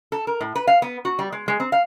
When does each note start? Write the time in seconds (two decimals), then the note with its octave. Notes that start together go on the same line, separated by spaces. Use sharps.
0.12 A4
0.27 A#4
0.41 A2
0.55 B4
0.67 F5
0.82 B3
1.05 F#4
1.19 G3
1.32 G#3
1.48 G#3
1.60 C4
1.72 F5